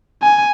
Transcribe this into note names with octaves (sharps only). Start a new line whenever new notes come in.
G#5